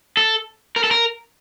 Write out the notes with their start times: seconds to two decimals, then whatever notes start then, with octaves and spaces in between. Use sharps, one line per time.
0.17 A4
0.76 A#4
0.84 A4
0.91 A#4